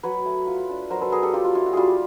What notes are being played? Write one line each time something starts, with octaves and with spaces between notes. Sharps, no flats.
F#3 B4 C#5
A3
F4
D4
F#3 A#4 C5
A4 B4
B3 G#4 A#4
G4 A4
F#3 F4 G4
F4
E4 F4
F#4
G3 F4 G4 G#4